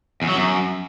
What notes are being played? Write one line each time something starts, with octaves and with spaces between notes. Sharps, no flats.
E2
F#3
F#2